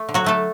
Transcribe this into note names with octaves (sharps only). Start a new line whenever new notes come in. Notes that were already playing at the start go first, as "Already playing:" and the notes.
Already playing: A3
D3
F#3 F#4
F#3 A3 A4